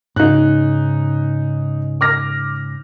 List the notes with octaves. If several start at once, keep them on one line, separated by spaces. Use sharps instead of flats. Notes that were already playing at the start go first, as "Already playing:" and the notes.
G#2 C#3 D#4 F#6
D6 F6 A#6